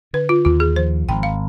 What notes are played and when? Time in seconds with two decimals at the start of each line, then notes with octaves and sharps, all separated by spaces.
0.13 D3 B4
0.29 F4
0.45 D#2 F4
0.60 G#4
0.76 F3 C5
1.08 G#1 G5
1.23 F5